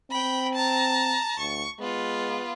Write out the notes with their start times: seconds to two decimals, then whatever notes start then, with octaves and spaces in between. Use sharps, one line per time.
0.11 C4 G5 B5
0.55 A5 A#5
1.39 D2 C#6
1.79 G#3 B3 F4